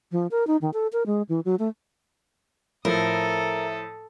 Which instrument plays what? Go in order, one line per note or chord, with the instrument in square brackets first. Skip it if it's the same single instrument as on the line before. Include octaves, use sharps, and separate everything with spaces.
[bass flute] F3
A#4
D#4
D#3
A4
A#4
G#3
E3
F#3
A3
[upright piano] A2 F3 [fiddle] A4 D#6 [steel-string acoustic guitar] A#4 [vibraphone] E5